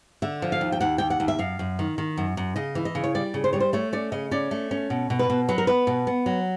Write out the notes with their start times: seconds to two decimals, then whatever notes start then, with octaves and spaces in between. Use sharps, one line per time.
0.22 D3 E5
0.42 F3
0.52 F5
0.61 D#2
0.72 G5
0.81 D#2 F#5
0.98 D#2 G5
1.10 F#5
1.20 D#2
1.28 E5
1.39 F#2 F5
1.59 F#2
1.79 D#3
1.98 D#3
2.18 F#2
2.37 F#2
2.56 C#3 D#5
2.75 E3
2.85 D#5
2.95 C#3
3.04 C#5
3.15 G3 D5
3.34 C#3
3.44 C5
3.53 G3 C#5
3.60 C5
3.73 A3 C#5
3.93 C#4 D5
4.12 C#3 D#5
4.31 C#4 D5
4.51 A3
4.71 C#4
4.90 B2
5.10 B2
5.19 B4
5.30 B2
5.49 F#3 B4
5.58 A#4
5.67 B3 B4
5.87 B2
6.07 B3
6.26 F#3